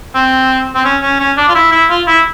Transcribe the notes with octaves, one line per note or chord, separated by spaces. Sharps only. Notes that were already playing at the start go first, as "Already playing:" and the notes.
C4
C4
C#4
C#4
C#4
D4
F4
E4
E4
F4
E4